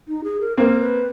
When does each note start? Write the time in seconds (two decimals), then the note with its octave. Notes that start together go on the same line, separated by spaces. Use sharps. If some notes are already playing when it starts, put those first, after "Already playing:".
0.08 D#4
0.24 G#4
0.41 A#4
0.57 A#3 C4 A#4 B4
0.80 B4